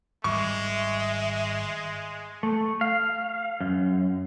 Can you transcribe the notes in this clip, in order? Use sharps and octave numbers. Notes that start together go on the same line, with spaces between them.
G#1 G3 G#3 E5 C#6
A3
F5
F#2